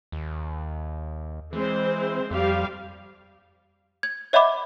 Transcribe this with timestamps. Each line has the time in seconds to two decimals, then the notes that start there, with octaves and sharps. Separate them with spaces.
0.12 D#2
1.53 E3 G#3 C4 C5
2.31 F2 G3 G4 F5
4.03 G#6
4.33 C#5 D#5 E5 F#5 B5 D6